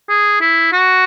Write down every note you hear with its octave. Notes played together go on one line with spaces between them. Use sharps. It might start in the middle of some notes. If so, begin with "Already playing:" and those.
G#4
E4
F#4